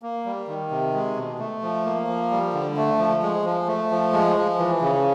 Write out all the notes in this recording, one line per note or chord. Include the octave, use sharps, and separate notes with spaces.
A#3
G3
D#3
C3
G#3
B2
A3
F3
A#3
F3
G3
D3
A3
F3
G#3
F3
A3
F3
G#3
F3
E3
C#3